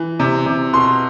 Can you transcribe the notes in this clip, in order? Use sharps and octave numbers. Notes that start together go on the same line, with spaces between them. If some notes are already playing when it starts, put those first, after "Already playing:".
Already playing: E3
C3
C3
B2 C6